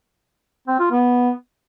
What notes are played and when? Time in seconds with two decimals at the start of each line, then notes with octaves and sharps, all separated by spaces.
0.68 C4
0.79 F4
0.91 B3